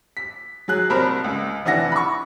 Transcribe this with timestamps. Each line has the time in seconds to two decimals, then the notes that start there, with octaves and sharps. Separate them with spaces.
0.17 B6
0.68 F#3 G#4 F#6
0.90 C2 A#4 C5 A5 B5 F6
1.24 C#2
1.65 F1 E3 D4 E4 F#5 A#6
1.92 B5 C#6